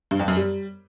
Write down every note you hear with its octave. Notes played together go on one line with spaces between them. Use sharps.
G2
F2
F#2
G3